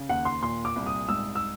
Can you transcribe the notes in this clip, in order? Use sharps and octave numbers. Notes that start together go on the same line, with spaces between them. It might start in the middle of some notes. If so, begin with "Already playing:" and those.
Already playing: C#3
D#2 F#5
C6
A#2 C6
D6
C2
D#6
G#2 E6
E6